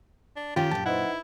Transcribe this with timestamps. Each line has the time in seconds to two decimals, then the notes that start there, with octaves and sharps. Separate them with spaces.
0.37 D4
0.56 D#3 C#4 F4 G4 G5 A6
0.71 F#2 A#2 A5
0.86 D#4 E4 B4 C5 F#5